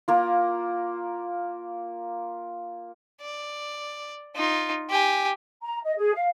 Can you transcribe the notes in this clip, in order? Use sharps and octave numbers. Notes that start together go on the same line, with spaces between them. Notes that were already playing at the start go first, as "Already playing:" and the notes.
A#3 F4
D5
D#4 F4
G4 G#5
A#5
D#5
G#4
F5